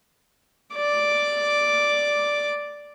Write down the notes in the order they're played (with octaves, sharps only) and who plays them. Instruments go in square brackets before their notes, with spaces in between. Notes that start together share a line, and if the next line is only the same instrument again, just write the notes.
[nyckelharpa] D5 D6